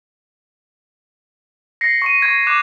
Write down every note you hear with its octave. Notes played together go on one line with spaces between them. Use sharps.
A#6 C7 C#7
C#6 D#7
C#6 G#6
D6 F#6 E7